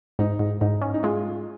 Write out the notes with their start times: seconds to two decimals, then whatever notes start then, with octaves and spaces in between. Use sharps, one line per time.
0.19 G#2 D#4
0.39 G#2
0.61 G#2 D#4
0.82 C#4
0.94 D#4
1.03 G#3 F4